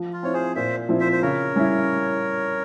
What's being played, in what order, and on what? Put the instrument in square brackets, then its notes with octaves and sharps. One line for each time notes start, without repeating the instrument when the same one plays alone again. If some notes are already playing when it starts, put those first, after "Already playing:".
Already playing: [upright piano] F3
[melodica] F4
[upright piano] C4 E4 [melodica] C#5
[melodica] G#4 C5
[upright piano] A#2 [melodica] C5 E5
[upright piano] F3 C4 E4
[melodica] C5 E5
C5
[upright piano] C#3 [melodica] A#4 C#5
[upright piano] G3 C#4 E4